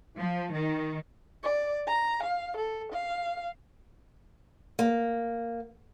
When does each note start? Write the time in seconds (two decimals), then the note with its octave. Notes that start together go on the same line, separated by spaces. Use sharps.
0.18 F3
0.54 D#3
1.43 D5
1.87 A#5
2.23 F5
2.57 A4
2.92 F5
4.79 A#3